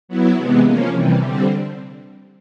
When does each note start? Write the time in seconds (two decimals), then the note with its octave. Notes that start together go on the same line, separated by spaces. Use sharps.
0.09 F#3 B3 E4
0.37 C3 E3 G#3 B3
0.65 F3 A#3 C#4
0.93 C3 E3 G3
1.21 D3 G3 C4